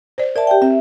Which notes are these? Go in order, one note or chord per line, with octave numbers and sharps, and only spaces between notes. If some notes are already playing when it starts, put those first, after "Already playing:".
C5 D5
A#4 D5 E5 A5
G4 G5
C4 E5